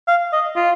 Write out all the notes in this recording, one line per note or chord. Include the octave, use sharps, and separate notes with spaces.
F5
D#5
F4